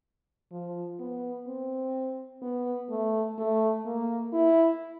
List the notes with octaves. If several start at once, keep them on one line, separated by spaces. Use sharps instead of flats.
F3
B3
C4
B3
A3
A3
A#3
E4